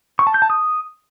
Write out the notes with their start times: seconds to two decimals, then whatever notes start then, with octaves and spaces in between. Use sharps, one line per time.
0.19 C#6
0.27 A5
0.34 G6
0.42 A5
0.50 D#6